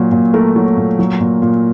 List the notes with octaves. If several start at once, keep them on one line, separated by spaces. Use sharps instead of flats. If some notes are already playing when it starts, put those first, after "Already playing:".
Already playing: A#2 F#3
A#2
A3 A#4
F#3
A#2
F#3
A#2
A#2